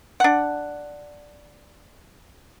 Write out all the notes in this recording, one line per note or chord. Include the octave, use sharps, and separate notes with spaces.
D4 F#5